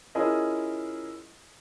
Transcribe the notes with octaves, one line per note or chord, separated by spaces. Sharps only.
C#4 E4 F4 G#4 A#4 D#5